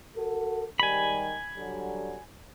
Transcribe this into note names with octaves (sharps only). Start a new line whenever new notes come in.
F#4 A4 A#4
G#2 D#3 G3 G#5 B5
D3 F#3 G3